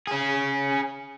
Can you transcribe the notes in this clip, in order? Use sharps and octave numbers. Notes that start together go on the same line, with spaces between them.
C#4 G#4